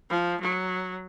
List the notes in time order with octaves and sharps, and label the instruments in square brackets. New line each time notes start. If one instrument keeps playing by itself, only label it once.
[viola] F3
F#3